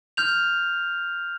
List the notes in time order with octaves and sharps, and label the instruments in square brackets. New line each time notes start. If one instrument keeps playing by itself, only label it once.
[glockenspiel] F6 G6 F7